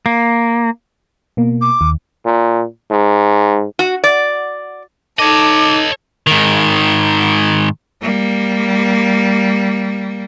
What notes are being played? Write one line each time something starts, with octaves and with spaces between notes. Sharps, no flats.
A#3
B2 A#3
D6
D#2
A#2
G#2
F#4
D5
D#4 A4 C#5 D#5 D6
G#2 D#3
G3 A#3